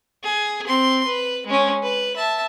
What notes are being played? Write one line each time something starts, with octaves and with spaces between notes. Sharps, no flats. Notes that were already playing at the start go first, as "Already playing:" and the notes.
G#4
C4 C6
B4
G#3 C#4
B4
E5 A5